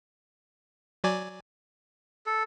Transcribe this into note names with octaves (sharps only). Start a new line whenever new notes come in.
F#3 D5 G#5
A4